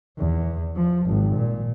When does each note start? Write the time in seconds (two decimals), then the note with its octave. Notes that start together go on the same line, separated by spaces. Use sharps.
0.18 E2
0.76 F3
1.06 G#1
1.36 A#2